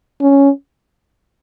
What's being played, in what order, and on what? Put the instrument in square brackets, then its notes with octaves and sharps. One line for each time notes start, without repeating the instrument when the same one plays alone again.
[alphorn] C#4